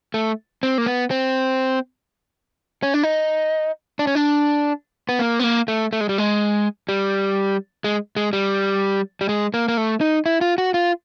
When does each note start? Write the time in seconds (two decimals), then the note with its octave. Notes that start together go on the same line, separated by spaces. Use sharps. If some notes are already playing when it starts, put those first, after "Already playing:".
0.14 A3
0.63 C4
0.78 A#3
0.86 B3
1.11 C4
2.83 C#4
2.94 D4
3.03 D#4
3.99 D4
4.07 C#4
4.15 D4
5.09 B3
5.19 A#3
5.39 B3
5.44 A#3
5.68 A3
5.93 A3
6.01 G#3
6.09 G3
6.18 G#3
6.89 G3
7.84 G#3
8.16 G#3
8.33 G3
9.21 G3
9.29 G#3
9.54 A#3
9.68 A#3
9.77 A3
10.01 D#4
10.26 E4
10.41 F4
10.58 F#4
10.74 F4